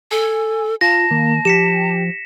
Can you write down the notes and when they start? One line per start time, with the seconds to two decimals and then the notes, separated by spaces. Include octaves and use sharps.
0.11 A4 G#5
0.81 F4 A5 A#6
1.11 D#3 A#3
1.45 F3 G4 B6 C#7 E7